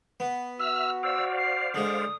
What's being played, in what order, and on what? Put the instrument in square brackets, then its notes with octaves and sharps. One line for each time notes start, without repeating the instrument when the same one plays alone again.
[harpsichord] B3
[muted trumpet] F#4 [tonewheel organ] E5 F6 [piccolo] E6
[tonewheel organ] C5 D5 F5 [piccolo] E6
[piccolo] C7
[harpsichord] D3 G#3 [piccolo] D#6